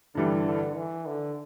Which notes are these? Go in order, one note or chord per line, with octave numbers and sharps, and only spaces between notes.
G2 D3 E3 G3
D3
E3
D3